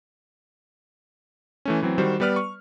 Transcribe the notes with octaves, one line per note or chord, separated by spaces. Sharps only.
E3 A3 C#4
E3 F#3 C4
D#3 G3 F#4 C5
G3 B3 B4 D5 F6
C#6